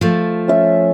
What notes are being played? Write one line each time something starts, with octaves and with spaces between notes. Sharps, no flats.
F3 A3
C#4 E5